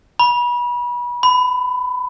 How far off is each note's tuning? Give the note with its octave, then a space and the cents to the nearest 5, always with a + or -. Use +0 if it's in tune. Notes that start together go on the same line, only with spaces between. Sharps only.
B5 -30
B5 +25